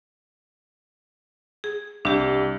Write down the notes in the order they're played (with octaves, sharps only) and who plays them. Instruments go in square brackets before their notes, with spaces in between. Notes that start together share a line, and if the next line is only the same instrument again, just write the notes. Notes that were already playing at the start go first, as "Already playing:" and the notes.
[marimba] G#4
[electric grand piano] C2 [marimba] D4 G4